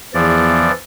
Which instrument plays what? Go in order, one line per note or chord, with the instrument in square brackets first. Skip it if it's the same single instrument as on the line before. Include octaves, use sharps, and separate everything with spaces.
[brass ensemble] E2 [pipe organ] E3 F3 D5